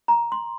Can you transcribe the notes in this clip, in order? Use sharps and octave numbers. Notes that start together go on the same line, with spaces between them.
A#5
C6